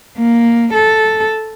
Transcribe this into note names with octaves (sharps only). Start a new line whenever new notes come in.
A#3
A4